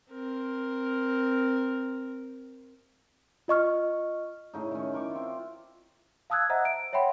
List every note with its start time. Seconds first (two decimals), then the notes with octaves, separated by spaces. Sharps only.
0.11 C4 A#4
3.48 F4 D#5 C#6 F6
4.54 A2 C#3 D#4
4.71 D#3 C#4
4.93 E4 A#4 C#6 D6
5.11 C4 F4
6.30 F5 A5 D#6 E6 F#6 G#6
6.49 C5 D#5 E5 F#5 A#5
6.65 D7
6.93 C#5 E5 F#5 G5 B5 C6